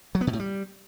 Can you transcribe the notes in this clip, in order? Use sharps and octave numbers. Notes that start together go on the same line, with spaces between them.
F#3
B3
B2
A2
G3